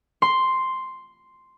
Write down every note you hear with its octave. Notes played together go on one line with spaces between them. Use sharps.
C6